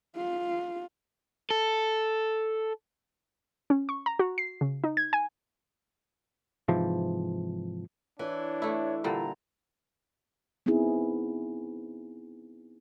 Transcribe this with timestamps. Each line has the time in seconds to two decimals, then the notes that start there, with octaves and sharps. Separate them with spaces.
0.17 F4
1.50 A4
3.70 C#4
3.89 C#6
4.06 A#5
4.19 F#4
4.38 C7
4.61 C#3
4.84 D#4
4.97 G#6
5.13 G#5
6.68 G#2 C3 E3 F3
8.19 E3 D4 C#5
8.62 A3 E4
9.04 A#2 D3 G3 A#5
10.66 B3 C4 D#4 E4 G#4